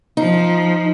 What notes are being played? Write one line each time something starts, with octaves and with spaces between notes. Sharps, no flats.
F3 D#4